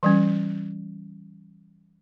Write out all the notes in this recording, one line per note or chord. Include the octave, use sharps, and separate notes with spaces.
E3 G3 C#4